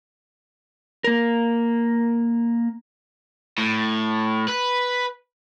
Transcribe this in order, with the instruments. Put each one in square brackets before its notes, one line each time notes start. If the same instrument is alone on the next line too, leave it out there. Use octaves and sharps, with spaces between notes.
[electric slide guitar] A#3 A#4
[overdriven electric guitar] A2
B4